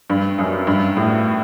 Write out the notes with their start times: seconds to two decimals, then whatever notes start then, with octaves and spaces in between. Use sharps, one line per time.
0.10 G2
0.38 F#2
0.67 G2
0.97 A2